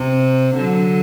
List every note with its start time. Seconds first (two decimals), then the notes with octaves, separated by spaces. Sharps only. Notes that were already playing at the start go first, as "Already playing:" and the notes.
Already playing: C3
0.56 D3 F#3